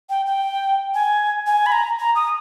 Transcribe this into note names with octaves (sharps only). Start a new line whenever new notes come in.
G5
G5
G#5
G#5
B5
A#5
A#5
D#6